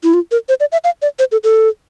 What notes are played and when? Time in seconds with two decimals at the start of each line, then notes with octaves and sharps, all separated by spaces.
0.03 E4
0.14 F4
0.31 A#4
0.49 C5
0.60 D5
0.72 E5
0.84 F5
1.02 D5
1.19 C5
1.32 A4
1.44 A4